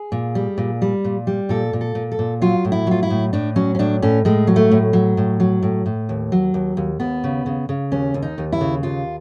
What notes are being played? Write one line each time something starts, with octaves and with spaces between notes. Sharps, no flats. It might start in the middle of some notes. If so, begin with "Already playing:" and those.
Already playing: G#4
A#2
G3
A#2
G3
A#2
G3
A#2 A4
A#2
A4
A#2
A4
A#2
F#3 F4
A2
E4
F#3 F4
E4
A2
A2 D4
F#3 C#4
C#4
A2 D4
A2 C#4
A2 G#3
F#3
A3
A2
F#3
A2
F#3
A2
A2
D#2
F#3
D#2
D#2
D#2 B3
C#3
C#3
C#3
D#2 C#4
D#2
D#4
D#2
E4
C#3
D#2 F4